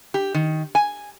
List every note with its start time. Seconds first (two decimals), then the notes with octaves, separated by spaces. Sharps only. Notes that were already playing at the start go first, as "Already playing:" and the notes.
0.14 G4
0.34 D#3
0.75 G#5